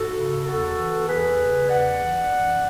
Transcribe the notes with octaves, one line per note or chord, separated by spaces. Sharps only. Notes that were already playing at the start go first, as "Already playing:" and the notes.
Already playing: G#2 F#4 A4
C#3
E2 F#4 A4
E3
E2 G#4 B4
C#3
E2 D5 F#5
E3
F#2